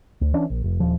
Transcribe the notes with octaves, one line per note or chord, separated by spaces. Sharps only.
D2
E3 C#4 D4
A#1
F1
D#1 F3